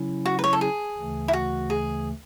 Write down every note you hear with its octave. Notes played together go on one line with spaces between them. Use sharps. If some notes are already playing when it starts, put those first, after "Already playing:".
Already playing: C#3 F#3 C#4 E4
F#4
B4
C#5
A4
G#4
D2 C#3 E3 A3
E4
F#4
G#4